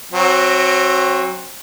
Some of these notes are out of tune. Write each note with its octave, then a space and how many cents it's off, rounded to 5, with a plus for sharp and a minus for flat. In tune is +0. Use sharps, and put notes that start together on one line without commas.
F#3 +0 C4 +25